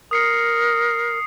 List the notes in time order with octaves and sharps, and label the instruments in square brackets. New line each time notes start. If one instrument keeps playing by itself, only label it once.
[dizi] A#4 [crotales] D#6 C7 C#7